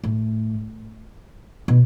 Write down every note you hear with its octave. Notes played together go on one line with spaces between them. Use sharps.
A2
B2